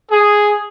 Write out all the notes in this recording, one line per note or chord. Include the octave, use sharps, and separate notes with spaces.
G#4